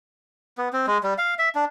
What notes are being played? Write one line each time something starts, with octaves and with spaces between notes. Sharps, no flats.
B3
C4
G#3
G3
F5
E5
D4